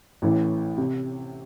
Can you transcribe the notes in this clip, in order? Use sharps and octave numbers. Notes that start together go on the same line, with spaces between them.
A1 A2 E3
C3